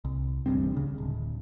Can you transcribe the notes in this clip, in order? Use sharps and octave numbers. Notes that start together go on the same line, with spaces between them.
C2
D1 A1 G2 C4
C#3
D1